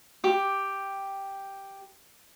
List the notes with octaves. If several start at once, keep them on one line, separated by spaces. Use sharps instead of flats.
G4 D6